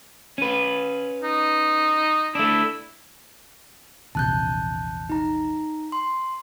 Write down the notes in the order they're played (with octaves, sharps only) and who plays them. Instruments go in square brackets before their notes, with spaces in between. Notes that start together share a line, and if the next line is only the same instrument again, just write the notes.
[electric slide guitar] C#4 B4
[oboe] D#4
[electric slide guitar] A3 D4 [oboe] E4
[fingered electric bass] A#1 E2 C3 [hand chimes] A5 F#6 G6
[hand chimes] D#4 A#5
C6